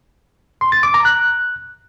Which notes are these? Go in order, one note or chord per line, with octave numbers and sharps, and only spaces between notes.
C6
A6
D6
A#5
F#6